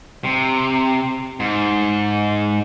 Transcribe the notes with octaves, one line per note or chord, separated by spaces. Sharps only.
C3
G#2